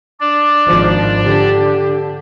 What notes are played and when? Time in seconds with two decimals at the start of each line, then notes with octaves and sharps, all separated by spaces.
0.20 D4 D5 D6
0.66 G#1 F3
1.24 D3 G4